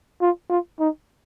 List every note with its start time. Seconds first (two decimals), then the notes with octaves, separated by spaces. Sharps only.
0.22 F4
0.50 F4
0.80 D#4